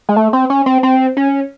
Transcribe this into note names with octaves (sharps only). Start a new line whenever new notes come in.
G#3
A3
C4
C#4
C4
C4
C#4